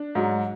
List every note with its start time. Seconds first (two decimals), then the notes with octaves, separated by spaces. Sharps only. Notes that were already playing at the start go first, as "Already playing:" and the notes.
Already playing: D4
0.15 G#2 F#3